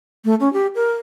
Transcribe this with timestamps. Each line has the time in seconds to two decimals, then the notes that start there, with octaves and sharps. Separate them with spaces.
0.25 A3
0.40 C#4
0.53 G4
0.75 A#4